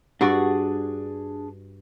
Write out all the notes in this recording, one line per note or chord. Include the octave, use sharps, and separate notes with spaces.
G2 D4 F#4 G#4 D5 C#6